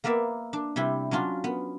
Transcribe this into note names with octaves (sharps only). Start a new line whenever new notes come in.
A#3 B3 A#4 D5 E5
D4
C3 G3 E4 G4
F#3 C#4 D4 F4 F#4
B3